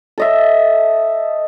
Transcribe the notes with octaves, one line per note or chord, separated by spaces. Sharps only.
A4 D#5 E5